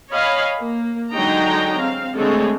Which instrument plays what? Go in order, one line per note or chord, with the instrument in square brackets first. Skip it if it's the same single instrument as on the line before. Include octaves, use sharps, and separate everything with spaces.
[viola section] C#5 D#5 F5 G#5 B5
A#3
D3 F#3 G#3 D#4 G5 A#5
C4 F5
D3 G#3 A3 C4 A4 C#5